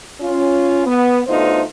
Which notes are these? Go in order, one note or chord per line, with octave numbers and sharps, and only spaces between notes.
C#4 F4
B3
D2 A3 B3 D#4 F4 C5